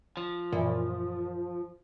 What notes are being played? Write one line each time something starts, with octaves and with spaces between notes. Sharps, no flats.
F3
F#2 A#2 E3